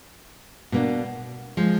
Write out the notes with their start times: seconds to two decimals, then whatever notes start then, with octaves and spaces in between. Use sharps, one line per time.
0.72 B2 A#3 D4
1.57 F3 G#3